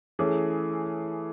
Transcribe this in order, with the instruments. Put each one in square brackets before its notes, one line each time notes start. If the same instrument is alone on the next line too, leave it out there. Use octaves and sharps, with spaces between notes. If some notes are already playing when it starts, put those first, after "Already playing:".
[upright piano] E3 A3 C#4 G#4